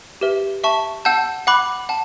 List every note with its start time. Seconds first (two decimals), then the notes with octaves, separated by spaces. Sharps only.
0.21 G4 B4 E5
0.64 E5 A5 C#6
1.05 F#5 A5 E6 G6
1.47 F#5 B5 D6 F#6
1.89 F#5 A5